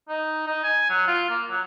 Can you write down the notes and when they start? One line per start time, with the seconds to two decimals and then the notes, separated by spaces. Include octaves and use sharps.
0.09 D#4
0.47 D#4
0.64 G#5
0.90 F#3
1.07 F4
1.30 A#3
1.50 F#3